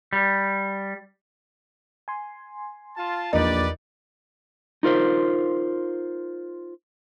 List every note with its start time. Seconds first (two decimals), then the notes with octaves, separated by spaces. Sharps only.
0.13 G3
2.08 G#5 C6
2.96 F4 A5
3.33 A#1 E2 D#4 F4 G4 A#4 B4 D5
4.83 D#4 F4 A#4 C5